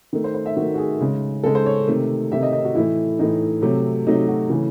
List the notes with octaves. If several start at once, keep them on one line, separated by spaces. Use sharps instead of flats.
D#3 A3
C5
C5
E5
D#3 A3 F#4
F#4
G#4
C#3 G#3
C#3 G#3 A4
C5
C#5
C3 D#3 A3
C3 D#3 A3 E5
D#5
D#5
F#4
A2 E3 A3 E4
A2 E3 A3 D#4
C3 F#3 A3
C3 F#3 A3 D#4
F#4
C#3 E3 A3